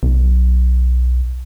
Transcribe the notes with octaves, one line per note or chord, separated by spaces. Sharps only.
B1